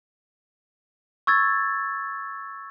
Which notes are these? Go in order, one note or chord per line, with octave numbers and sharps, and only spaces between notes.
C#6 E6 G#6 A6